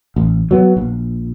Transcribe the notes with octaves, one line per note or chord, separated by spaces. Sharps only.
A1
F#3 B3
A#1